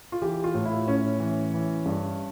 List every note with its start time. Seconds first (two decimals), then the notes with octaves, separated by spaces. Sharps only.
0.12 F4
0.22 E3 G4
0.44 F4
0.55 A2
0.66 E4
0.87 A2 C#4
1.20 E3
1.54 E3
1.86 G2